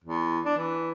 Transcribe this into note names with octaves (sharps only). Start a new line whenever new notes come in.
E2
D4
E3